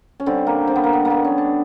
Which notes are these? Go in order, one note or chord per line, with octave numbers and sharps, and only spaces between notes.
C#4
D3 G3 C4
A#3
C4
B3
A#3
B3
A#3
B3
C#4
D4